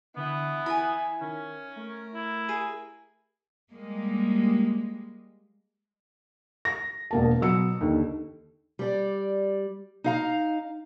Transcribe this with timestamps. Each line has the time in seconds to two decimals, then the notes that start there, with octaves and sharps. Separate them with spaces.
0.17 D3 E3 B3
0.66 E4 G#5 B5
1.21 D#3 C#4
1.76 A3 A#4
2.14 E4
2.49 G#4
3.70 G3 G#3 A#3
6.65 A#6
7.11 E1 A#3 A5
7.41 B2 F#3 E6 C#7
7.81 D#2 D3 D#3
8.79 G3 D5
10.04 D#4 F5 A#5